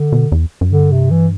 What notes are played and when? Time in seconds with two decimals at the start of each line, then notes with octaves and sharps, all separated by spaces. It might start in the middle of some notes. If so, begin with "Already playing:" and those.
Already playing: D3
0.12 B2
0.32 E2
0.61 F#2
0.71 G2 D3
0.92 C3
1.11 E3